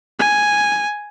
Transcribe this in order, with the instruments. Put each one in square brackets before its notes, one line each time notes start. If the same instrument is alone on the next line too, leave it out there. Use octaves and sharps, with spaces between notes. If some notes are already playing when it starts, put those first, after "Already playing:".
[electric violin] G#5